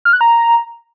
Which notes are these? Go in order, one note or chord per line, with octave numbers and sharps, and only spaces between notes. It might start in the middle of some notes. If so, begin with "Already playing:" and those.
F6
F#6
A#5